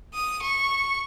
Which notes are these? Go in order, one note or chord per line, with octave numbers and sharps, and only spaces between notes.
D#6
C#6